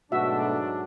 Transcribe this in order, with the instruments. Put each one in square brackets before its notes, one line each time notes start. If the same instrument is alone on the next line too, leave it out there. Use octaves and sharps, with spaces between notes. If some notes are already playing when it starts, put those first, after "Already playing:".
[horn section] G#2 F#3 D4 [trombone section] B2 A3 [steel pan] F#4 E5